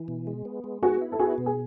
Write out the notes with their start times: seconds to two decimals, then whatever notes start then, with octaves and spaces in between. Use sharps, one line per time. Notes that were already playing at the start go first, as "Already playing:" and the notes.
Already playing: E3
0.08 B2
0.27 G#3
0.45 B3
0.64 G#3
0.83 B3 F#4 G#4
1.01 E4
1.12 A4
1.19 B3 F#4 G#4
1.38 B2
1.46 G#4